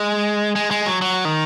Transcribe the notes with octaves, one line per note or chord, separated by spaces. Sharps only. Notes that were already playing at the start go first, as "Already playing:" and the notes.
Already playing: G#3
G#3
G#3
F#3
F#3
D#3